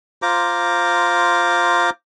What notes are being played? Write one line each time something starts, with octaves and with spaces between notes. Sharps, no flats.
F4 C5 A#5 D6